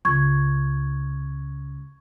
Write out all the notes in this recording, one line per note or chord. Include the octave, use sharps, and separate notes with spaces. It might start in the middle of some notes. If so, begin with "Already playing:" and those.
C#2 C#6 G#6